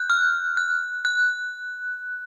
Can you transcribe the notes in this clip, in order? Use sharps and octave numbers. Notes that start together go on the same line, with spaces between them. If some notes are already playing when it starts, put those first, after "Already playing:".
Already playing: F#6 G6
F6
F#6
F#6